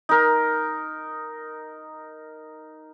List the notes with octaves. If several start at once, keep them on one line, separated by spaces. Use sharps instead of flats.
D#4 A#4